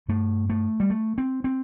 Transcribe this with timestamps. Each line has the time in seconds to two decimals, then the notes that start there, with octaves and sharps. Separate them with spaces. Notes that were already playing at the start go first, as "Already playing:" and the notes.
0.08 G2 A3
0.50 A3
0.80 G3
0.90 A3
1.18 C4
1.44 C4